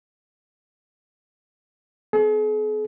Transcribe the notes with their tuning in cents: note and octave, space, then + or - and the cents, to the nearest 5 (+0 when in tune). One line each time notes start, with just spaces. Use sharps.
B3 +40 G#4 +45